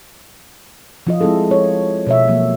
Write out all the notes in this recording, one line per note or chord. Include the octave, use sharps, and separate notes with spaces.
F3 F4 D#5
G#3 C4 E4 G#4 A4
C#5
B2 C#5 E5
F3 F#3 A#3